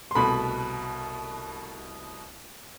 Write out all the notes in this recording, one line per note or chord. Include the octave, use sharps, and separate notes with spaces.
C6
C2 B2 A3 B5